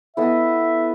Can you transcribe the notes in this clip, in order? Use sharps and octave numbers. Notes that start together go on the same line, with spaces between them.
B3 E4 A4 D#5 E5